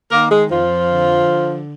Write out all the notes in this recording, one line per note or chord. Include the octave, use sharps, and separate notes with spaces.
D#3 A#3 A#4
G#3 G#4
F2 F3 F4
D3